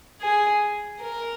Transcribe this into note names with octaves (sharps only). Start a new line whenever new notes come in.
G#4
A#4